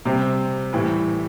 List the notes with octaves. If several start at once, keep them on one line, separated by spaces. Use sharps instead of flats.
C3 G3 C4
A2 E3 G3